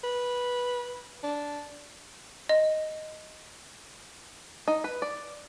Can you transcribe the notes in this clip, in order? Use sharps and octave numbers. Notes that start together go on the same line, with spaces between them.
B4
D4
D#5
D#4
B4
D5